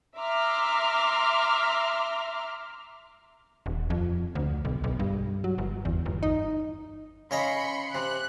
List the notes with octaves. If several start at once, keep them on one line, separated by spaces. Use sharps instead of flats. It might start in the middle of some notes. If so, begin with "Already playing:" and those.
E5 A#5 C6 D6 F6
D#1
F2
D2
B1
B1
G2
F#3
G1
E2
G1
D#4
C#3 C#5 D#5 B5 C6 C#7
C3 F#6